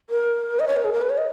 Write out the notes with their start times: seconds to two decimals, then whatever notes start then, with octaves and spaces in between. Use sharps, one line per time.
0.10 A#4
0.59 D#5
0.68 C#5
0.76 A#4
0.84 G#4
0.93 A#4
1.01 B4
1.10 C#5
1.18 D#5